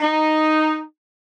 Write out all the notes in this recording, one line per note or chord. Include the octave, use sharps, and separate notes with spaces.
D#4